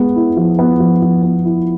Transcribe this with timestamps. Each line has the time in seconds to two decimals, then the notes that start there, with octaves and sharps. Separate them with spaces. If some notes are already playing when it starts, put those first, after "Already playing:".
Already playing: G#3 B3
0.16 E4
0.37 F3
0.59 B3
0.80 F3
1.02 F3
1.23 B3
1.45 E4